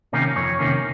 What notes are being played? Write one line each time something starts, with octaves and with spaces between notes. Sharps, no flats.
C3 D#3 A#3 C#4
F2 C#5
C3 D#3 A#3 C#4